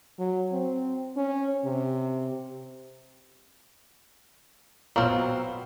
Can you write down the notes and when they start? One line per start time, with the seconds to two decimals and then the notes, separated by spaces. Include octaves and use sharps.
0.19 F#3
0.53 C4
1.17 C#4
1.65 C3
4.96 B2 F#3 C4 F4 A#4 F5